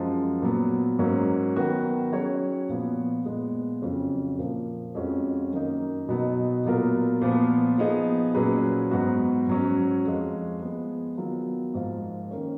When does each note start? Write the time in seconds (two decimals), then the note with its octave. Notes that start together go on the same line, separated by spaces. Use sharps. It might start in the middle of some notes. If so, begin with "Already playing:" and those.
Already playing: F#2 F3 G#3
0.42 A#2 F#3 B3
0.99 G#2 F#3 A#3 C#4
1.56 D#3 F#3 B3 F#4 B4
2.12 F#3 C#4 G#4 C#5
2.69 A#2 F3 B3 F4
3.26 A#2 G#3 B3
3.82 F2 C#3 F#3 C#4 F4
4.39 A#2 F3 A#3
4.95 F2 F3 G#3 C#4 F#4
5.52 F#2 D#3 A#3 D#4
6.09 B2 F#3 B3 D#4
6.65 A#2 F#3 B3 F4 A#4
7.21 A#2 F3 B3
7.78 F3 B3 D#4 G#4
8.35 A#2 F#3 C#4 G#4 B4
8.91 G#2 F#3 B3 F#4
9.48 G#2 F#3 C#4
10.05 F2 F3 G#3
10.62 F3 G#3 B3
11.18 D#3 F#3 B3 F4
11.74 G#2 F3 A#3 F4
12.31 D#3 A#3 C#4